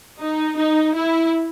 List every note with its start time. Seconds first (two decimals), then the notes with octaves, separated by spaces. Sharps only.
0.20 D#4
0.57 D#4
0.95 E4